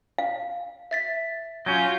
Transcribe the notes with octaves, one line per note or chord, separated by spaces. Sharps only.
F5
E5 A6 B6
F#3 C#4 F4 G6